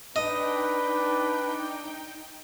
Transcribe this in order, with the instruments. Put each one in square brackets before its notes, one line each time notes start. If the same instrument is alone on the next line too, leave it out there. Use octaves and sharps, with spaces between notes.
[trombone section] D4 [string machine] D#4 G5 [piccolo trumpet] B4 [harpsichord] D#5